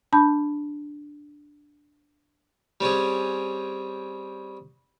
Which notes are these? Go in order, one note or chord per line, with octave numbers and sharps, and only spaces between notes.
D4 A5 B5 G6
G3 C4 C#4 G#4